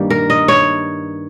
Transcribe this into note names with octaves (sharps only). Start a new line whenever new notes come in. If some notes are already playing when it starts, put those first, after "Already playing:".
Already playing: G2 D#3 G3 A#3
A#4
D#5
C#5